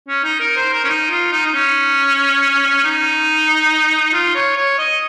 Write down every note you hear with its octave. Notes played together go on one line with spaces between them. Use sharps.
C#4
D#4
A#4
C5
A#4
C#4
D#4
F4
D#4
D#4
C#4
D#4
F4
C#5
C#5
D#5